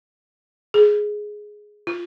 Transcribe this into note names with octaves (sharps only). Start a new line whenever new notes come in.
G#4
F4